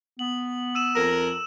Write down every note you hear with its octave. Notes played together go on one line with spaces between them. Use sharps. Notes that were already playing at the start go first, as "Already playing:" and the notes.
B3 F#7
E6 D#7 E7
F2 A#4